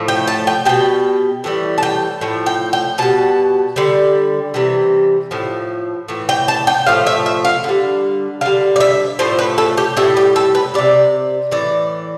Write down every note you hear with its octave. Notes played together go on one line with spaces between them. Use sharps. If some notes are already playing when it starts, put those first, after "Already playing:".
Already playing: A2 F3 A3
G5
A5
G5
B2 G3 G5
A2 E3 G3
A5
G5
A2 F3
G5
G5
B2 G3 A5
D3 G3
C3 E3 G3
A2 F3
A2 E3
G5
A5
G5
A2 F3 A3 F5
E5
E5
F5
D3 G3
D3 G3 F5
D5
E5
A2 F3 A3 C5
B4
A4
G4
A2 G3 E4
G4
A4
B4
C3 G3 D5
A2 E3 D5